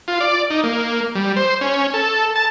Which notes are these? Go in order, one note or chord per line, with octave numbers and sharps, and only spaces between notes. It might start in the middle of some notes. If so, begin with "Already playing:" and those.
F4
D5
D#4
A#3
G3
C5
C#4
A4
A5